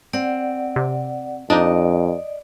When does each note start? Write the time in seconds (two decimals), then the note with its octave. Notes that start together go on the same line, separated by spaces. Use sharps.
0.13 C4 D5 F#5
0.76 C3
1.50 F2 D4 D#4 D5 D#5